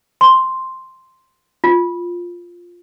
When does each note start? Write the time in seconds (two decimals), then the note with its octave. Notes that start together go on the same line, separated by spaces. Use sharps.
0.21 C6
1.64 F4